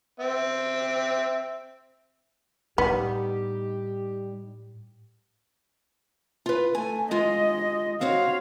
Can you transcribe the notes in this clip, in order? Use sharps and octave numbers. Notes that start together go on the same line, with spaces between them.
C4 E5
A2 G3 B3 D#4 G4
F4 B4
A3 G#5
G#3 F4 D#5
C4 F#4 C#5 F5